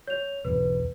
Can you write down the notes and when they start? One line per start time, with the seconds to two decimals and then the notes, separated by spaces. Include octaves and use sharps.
0.08 C#5 F7
0.45 B1 E2 B4